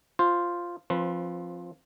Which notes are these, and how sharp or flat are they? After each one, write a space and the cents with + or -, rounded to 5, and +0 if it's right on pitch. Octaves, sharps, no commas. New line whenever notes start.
F4 +0 C5 +0
F3 +0 C4 +25 B4 +0